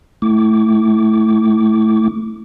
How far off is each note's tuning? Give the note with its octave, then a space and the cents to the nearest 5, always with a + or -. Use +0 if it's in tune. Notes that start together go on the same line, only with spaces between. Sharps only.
A3 -5 E4 +0 D6 -35